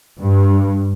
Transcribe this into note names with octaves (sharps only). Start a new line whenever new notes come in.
G2